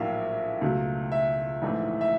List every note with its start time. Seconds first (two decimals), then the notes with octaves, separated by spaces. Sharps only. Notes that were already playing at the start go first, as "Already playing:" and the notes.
Already playing: A#1 A2 F#3 A#3 E5 F5
0.61 C#2 B2 F#3 A3
1.12 E5
1.62 A#1 G#2 E3 A3
2.01 E5